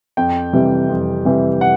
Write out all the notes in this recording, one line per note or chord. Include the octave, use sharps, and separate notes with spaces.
F2 G5
C3 E3 G3
F2
C3 E3 G3
F#5